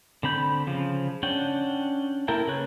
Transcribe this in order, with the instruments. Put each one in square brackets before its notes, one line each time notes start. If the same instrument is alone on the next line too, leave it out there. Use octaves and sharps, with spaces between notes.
[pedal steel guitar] D3 C4 B5 G6
C#3 F3
C#4 D4 F#5 G5
A#3 E4 A4 A#4 G5
C#3 B4 C#5 F#6